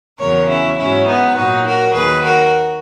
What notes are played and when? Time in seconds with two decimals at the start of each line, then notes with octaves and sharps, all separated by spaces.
0.19 E2 C#3 F#3 A#4 C#5
0.48 C#4 E4
0.77 G#2 F#3 C#4 E4
1.06 B3 D#4
1.36 A#2 F#3 D#4 F#4
1.65 F#4 A#4
1.94 D#2 D#3 F#3 G#4 B4
2.23 F#4 A#4